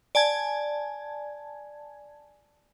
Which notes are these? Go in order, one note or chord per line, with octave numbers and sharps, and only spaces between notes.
D5 G#5 A5 G#6